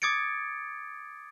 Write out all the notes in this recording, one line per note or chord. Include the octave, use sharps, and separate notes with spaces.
D6 D#6 G#6 A6 C#7 D7